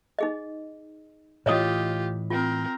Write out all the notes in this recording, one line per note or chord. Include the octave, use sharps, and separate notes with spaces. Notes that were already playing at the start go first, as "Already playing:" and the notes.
D#4 G#4 D#5
A2 E3 F4 G4 C#5 D#5 D#6
C4 F4 A#4